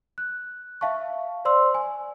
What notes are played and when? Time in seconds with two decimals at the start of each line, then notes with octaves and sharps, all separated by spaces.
0.18 F#6
0.81 E5 F5 A5 C#6
1.45 C5 D5 C6 E6
1.75 G#5